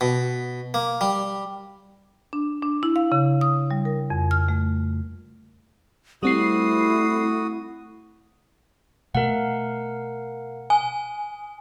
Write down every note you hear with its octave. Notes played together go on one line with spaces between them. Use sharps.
B2
A#3
G3
D4
D4
E4
F5
C#3
D#6
G3
A#4
F2
F6
A3
G3 A3 C4 E4 F#4 D#6 C7
B2 A3 A#4 F5 F#5
G#5 D#6